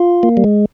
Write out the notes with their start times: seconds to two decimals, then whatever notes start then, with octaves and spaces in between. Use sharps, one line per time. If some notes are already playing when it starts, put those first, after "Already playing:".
Already playing: F4
0.23 A#3
0.37 G3
0.44 G#3